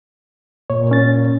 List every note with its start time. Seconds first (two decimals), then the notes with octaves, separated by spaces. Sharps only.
0.70 A#2 C#5
0.91 C#4 A6